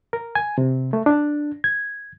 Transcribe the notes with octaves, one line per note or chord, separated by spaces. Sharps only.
A#4
G#5
C3
A3
D4
G#6